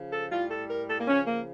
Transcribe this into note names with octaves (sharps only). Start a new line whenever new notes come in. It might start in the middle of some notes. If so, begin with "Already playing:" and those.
Already playing: C#3 F3
A4
A2 G3 F4
A4
A#4
A4
A#3
C#3 F3 C#4
A#3